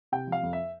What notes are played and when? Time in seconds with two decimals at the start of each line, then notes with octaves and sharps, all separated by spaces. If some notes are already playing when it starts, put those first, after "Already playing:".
0.12 C3 G5
0.27 F3
0.32 F5
0.43 F2
0.53 E5